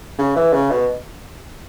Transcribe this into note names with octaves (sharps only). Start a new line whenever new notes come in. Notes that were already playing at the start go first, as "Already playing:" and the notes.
C#3
E3
C#3
B2